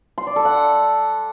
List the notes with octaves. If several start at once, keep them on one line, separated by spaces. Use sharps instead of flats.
C6
D5
A4
F#5